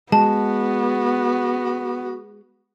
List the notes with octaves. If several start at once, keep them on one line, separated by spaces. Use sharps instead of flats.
G#3 B3 F#4 A5